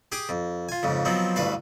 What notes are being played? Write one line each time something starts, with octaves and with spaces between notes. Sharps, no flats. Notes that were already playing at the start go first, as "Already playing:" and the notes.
G4 G#4 D6 D#6
F2
F4 G#5
F2 G#2 C#3
F3 F#3 B3 C4 D#4
A1 D2 G2 B4 F5